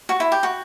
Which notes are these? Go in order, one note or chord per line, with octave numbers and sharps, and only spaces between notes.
F#4
E4
G4
F#4